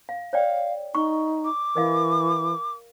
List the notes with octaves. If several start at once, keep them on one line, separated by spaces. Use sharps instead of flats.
F5
C#5 D5 F5 G5
D#4 C#6
D6
E3 A#4 D#5 F5